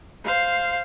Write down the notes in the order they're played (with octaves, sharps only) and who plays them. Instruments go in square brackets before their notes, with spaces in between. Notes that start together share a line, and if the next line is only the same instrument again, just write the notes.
[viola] C5 F5